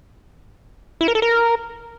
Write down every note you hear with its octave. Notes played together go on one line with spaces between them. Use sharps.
E4
A#4
A4
A#4